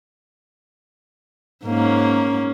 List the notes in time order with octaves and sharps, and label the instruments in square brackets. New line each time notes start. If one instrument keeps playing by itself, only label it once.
[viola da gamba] G#2 A#3 C#4